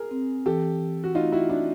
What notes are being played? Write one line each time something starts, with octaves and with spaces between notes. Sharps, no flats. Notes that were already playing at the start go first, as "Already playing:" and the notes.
Already playing: G#4 A#4
C4
E3 G4 A4
E3
F#4
A3 D#4 F4
E4 F#4
C4 D4 E4